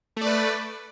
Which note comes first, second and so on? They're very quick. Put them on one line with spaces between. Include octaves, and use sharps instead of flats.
A3 D5 B4